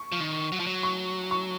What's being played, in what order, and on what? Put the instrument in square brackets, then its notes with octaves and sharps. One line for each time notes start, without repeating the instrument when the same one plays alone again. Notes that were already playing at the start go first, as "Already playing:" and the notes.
Already playing: [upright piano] C#6
[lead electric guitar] F3
D#3
F#3
F3
F#3
[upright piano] C#6
C#6